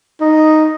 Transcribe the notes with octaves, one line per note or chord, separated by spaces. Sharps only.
D#4